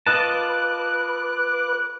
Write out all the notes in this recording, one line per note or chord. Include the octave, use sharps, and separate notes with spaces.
F4 B4 D#5 A5 D6 F#6